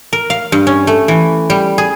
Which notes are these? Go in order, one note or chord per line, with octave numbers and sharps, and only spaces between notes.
A#4
F5
G2
C#4
A3
E3
G3
G#4